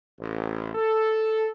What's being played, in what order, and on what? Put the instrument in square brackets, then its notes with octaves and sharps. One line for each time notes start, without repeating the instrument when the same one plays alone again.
[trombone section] A1
A4